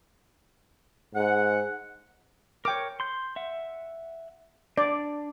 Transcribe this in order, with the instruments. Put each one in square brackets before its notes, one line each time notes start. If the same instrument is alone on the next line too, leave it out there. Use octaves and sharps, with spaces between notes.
[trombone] G#2 [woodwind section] F#5
[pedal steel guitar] A#4 C#5 [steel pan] G5 D6
[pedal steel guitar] C6 G6
E5 F#5
[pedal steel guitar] D4 [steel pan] D5